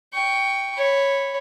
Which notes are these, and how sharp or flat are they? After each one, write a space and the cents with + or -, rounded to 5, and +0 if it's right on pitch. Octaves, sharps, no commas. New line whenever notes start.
G5 +0 C#6 +15
C#5 -5 B5 +0